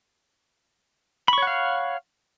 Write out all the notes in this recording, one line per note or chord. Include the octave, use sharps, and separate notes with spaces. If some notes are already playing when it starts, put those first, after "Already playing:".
C#5 F5 F#5 B5 C#6